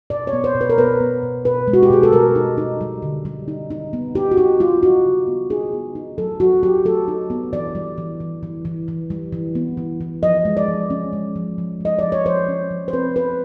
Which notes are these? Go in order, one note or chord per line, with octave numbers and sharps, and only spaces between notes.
B2 D5
C#5
B3
C5
B2
B4
A#4
B3 B4
B3
B2
B2 B4
G#3
F#4
G4
B2 G#4
A4
G3 A#4
D#4
D#4
G3
D3
G3
D#4
D#4
B3
D#4 G4
F#4
D#4 G4
G3 F4
D#4 F#4
C#3
B3
D#4 G#4
B3
D#4
F#3 A4
F#3 F#4
F#3 G4
F#3 A4
D#4
B3
E3 D5
G3
E3
E3
E3
E3
E3
G3
E3
B3
E3
E3
F3 D#5
G#3
D5
F3
C#4
G#3
F3
F3
G#3 D#5
F3 D5
C#5
F3 C5
C#4
F3
C5
C4 B4
C4 B4